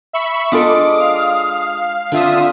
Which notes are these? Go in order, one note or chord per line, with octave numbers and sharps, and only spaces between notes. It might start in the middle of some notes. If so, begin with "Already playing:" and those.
E5 B5 C#6
G#3 D4 F4 A4 D6 D#6
F5
D3 C4 F4 E5 D#6